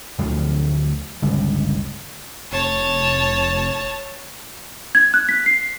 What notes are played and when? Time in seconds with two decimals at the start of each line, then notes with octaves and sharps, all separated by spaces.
0.18 D2 D3 F3 F#3
1.22 G1 C#2
2.52 F1 C#5 A5
4.95 G#6
5.14 F#6
5.29 B6
5.46 C7